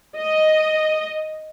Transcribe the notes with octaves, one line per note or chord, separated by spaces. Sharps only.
D#5